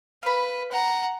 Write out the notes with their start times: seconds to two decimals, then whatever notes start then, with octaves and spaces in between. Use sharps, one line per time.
0.23 B4 F5 B5
0.71 F#5 A#5